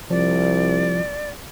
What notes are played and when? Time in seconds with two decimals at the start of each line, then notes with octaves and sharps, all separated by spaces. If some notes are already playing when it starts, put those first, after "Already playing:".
0.11 C2 F3 D5